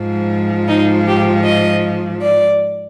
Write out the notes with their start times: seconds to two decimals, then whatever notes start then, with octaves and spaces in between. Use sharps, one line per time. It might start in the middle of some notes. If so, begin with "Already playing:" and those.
Already playing: G#2 F3
0.69 D#4
1.08 G4
1.45 D#5
2.23 D5